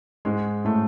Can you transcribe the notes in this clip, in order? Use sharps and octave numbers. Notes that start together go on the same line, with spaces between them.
G#2 G#3
A2 A3